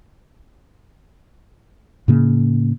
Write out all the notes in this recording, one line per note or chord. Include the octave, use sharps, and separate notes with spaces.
A2 C#3 A#3